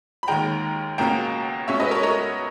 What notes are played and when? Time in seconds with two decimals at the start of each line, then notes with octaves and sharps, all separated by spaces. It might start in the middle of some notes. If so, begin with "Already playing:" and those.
0.23 B5
0.28 D#2 D#3 G#3 G5 A#5
0.98 C#2 B2 A#3 C#4 G5 A#5
1.68 B2 G#3 C#4 C#5 E5
1.80 B4 D#5
1.91 A#4 C#5
2.03 A#4 C#5